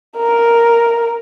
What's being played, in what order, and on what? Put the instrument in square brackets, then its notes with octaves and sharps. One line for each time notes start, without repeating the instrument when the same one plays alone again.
[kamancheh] A#4